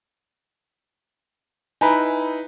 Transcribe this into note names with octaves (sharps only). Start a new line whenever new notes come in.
D#4 E4 B4 G#5 A#5 B5